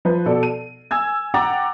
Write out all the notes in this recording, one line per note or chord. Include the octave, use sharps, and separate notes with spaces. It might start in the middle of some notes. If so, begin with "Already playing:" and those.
F3 B4
B2 A4 D5
D#7
G#5 E6 G#6
F#5 G5 A#5 D6 A6